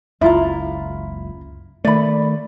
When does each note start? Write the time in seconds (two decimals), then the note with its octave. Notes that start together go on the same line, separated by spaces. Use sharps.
0.21 F#1 C#2 E4 F4 A#5
1.85 D#3 A3 D5 B5